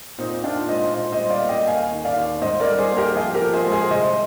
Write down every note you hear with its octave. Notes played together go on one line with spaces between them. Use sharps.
A#2 C4 D#4
A#2 D4 F4
G#3 C5 D#5
A#2 C5 D#5
C5 D#5
G3
D5 F5
A#3
D#5 G5
D#2 F5 G#5
D#3
D5 F5
D#2
G#2 C5 D#5
A#4 D5
G3
G#4 C5
A#3
G4 A#4
F3 F4 G#4
G4 A#4
F3
G#4 C5
G#3
G#4 C5
C2 C5 D#5